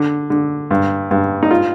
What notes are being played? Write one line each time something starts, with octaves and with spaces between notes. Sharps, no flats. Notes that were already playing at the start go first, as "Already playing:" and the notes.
Already playing: D3
D3
G2
G2
D#4
F4